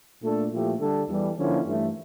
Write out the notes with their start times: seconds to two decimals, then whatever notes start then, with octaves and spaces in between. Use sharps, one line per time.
0.22 A#2 A3 D4 A4
0.51 A#2 F3 A3 E4 G4
0.79 D3 G3 D4 A4
1.08 E2 E3 G3
1.37 D3 F3 A#3 C#4 E4
1.65 G2 E3 A3